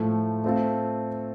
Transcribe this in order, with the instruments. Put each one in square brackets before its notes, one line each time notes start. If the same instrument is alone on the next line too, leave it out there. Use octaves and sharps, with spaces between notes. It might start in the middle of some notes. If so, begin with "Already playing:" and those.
Already playing: [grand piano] A2 F3 A3
A3 C4 F4 A4